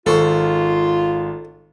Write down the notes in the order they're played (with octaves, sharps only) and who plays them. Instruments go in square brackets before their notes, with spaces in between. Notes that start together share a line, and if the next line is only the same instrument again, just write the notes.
[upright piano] G#1 C#6 [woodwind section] F4 [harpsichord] A4 C5